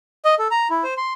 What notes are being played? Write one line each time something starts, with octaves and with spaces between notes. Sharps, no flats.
D#5
A4
A#5
E4
C5
C6